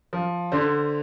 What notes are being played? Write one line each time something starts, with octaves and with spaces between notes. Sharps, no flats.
F3
D3 C5